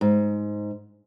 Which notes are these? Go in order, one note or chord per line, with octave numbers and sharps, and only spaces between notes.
G#2